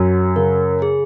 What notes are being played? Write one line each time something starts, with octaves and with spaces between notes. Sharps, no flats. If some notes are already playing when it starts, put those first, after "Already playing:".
Already playing: F#2 F#4
C#3 A#4
G#4